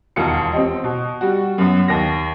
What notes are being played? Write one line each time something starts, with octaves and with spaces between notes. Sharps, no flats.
E1 D#2 F4 C#7
C4 G4 D#5
B2
G3 F#4
F#2 B3
D#2 A#6